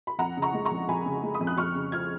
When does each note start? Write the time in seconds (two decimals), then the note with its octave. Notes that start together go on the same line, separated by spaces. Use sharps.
0.07 B5
0.19 F2 F#5 A#5
0.37 C#3
0.42 A#5 C#6
0.54 G#3
0.65 A#5 C#6
0.71 F2
0.89 F2 G#5 B5
1.06 C#3
1.23 G#3
1.34 B5 D#6
1.40 F2
1.47 F#6
1.58 F2 C#6 F6
1.75 C#3
1.92 F3 F6 G#6